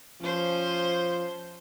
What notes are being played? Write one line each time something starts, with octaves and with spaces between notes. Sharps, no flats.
F3 C#4 C5